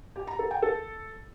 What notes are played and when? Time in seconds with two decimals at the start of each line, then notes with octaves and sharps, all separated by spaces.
0.16 G4
0.27 A#5
0.39 A4
0.51 G5
0.62 A4